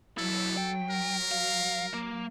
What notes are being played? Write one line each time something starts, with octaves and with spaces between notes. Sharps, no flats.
B1 F#3 E4 A4
G5
A#4
F5
A#3